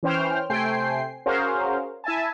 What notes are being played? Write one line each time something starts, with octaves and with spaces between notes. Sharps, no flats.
E3 C#4 C5 G5 F6
C3 A3 C5 G5 G#5 C7
C#4 F#4 G#4 A#4 C5 F5
E4 E5 G#5 A5